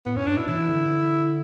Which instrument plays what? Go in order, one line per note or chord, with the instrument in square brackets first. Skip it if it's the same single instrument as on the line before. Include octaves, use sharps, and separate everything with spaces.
[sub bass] A2 [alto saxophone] B3
[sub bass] G2 [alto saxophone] C#4
[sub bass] G2 [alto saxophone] D4
[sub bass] B2 [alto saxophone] E4
[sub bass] E3 [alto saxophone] E4
[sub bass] D3